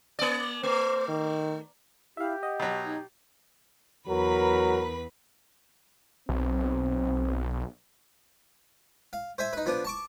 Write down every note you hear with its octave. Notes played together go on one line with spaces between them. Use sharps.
A#3 D5
A3 C5
D#3
E4 G4 E5 F5
D#5 F#5
B2 F#3
D#4 G#6
E2 F#3 A#4 B4 B5
B1 C4
F5
C5 E5 G#5
D#4 B4
F3 B3 D4
A5 C#6 D6